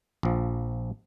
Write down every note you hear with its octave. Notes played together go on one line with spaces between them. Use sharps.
A#1 F3